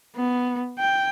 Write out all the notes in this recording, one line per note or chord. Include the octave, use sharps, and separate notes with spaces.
B3
G5